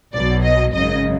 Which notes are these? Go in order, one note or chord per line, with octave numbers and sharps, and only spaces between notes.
B1 B2 F#3 D5
D#5
G#1 F#2 C#3 D#5